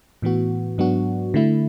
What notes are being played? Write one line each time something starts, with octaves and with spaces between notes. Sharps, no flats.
A2 E3 B3 F#4
G#2 F#3 B3 D4 F#4
D3 A3 E4